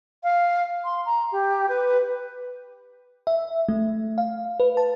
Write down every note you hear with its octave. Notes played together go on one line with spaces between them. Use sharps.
F5
C6
A#5
G4
B4
E5
A3
F5
B4
A5